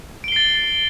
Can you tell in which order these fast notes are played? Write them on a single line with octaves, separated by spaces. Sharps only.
D7 G7 C7 A6